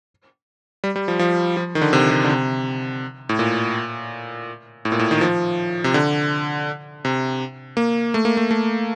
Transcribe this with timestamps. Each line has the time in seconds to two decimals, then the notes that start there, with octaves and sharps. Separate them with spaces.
0.84 G3
0.96 G3
1.08 F3
1.19 F3
1.57 F3
1.75 D#3
1.81 D3
1.93 C3
2.11 C3
2.24 D3
2.29 C3
3.29 A2
3.39 A#2
4.85 A2
4.92 A#2
4.99 A2
5.11 D#3
5.21 F3
5.84 C3
5.94 D3
7.05 C3
7.77 A#3
8.14 A3
8.25 A#3
8.37 A3
8.51 A3